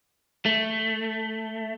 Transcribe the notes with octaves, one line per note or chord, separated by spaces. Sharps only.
A3